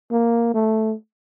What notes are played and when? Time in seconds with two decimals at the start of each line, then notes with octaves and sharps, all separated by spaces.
0.11 A#3
0.54 A3